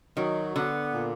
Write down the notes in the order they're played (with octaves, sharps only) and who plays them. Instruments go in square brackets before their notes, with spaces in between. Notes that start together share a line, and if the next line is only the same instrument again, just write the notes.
[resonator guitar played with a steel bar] D#3 [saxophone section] F#3
[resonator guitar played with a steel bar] D3 [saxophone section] B3
[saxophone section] A#2